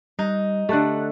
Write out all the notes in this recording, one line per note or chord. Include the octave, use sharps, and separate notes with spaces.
G3 D#4
D3 A3 G4 A5 F#6